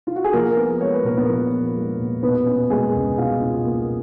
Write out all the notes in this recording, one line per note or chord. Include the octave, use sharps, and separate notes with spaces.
F4
F#4
G#4
F3 A#3 A#4
B3
G#3 C#5
B4
A#2 A#4
B3 B4
F3
B3
G#3
A#2
B2 B3 B4
C#4
G#3 A#3 G#4
C#2
B2 F4 F5
C#4
A#3